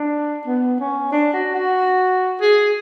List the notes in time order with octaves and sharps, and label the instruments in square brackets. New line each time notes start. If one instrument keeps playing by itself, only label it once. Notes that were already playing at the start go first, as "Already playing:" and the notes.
Already playing: [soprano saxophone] D4
B3
C#4
D4
F#4
F#4
G#4